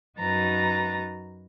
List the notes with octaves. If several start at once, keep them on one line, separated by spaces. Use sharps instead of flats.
F#2 D#4 F#4 B4 A#5 A6